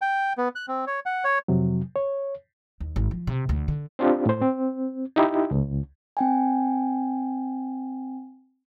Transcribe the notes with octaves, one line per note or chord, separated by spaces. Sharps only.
G5
B3
F#6
C4
C#5
F#5
C#5
F2 C3 F#3
C#5
D#2
G#1
F3
C3
D2
D3
C4 D4 F4 G4
A2 C5
C4
D#4 E4 G4
C#2
C4 G5 G#5